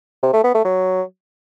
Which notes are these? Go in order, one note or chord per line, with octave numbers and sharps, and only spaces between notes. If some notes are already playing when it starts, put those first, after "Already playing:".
C3
A3
B3
A3
F#3